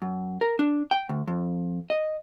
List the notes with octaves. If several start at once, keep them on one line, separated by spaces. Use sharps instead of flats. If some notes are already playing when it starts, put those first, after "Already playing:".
F#2
A#4
D4
G5
D2
F2
D#5